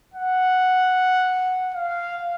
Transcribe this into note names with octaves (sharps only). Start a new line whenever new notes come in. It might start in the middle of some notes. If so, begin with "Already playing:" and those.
F#5
F5